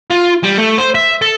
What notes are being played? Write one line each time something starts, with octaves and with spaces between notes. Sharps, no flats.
F4
G3
A3
C5
E5
A4